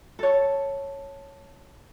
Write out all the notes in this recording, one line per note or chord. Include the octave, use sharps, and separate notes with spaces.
A4 C#5